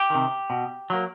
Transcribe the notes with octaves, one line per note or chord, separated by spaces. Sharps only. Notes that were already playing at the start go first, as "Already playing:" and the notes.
Already playing: G4
C3 D#3
B2
F#3 A#3